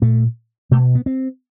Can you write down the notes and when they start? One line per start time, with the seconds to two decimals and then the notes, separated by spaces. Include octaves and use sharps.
0.02 A#2 A3
0.71 B2 A3
0.95 B3
1.06 C4